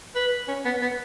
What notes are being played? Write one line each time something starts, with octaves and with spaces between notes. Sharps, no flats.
B4
C#4
B3
B3